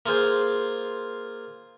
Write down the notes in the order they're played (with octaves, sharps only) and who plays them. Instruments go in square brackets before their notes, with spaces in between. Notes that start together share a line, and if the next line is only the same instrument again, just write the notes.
[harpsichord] A#3 F4 G#4 C5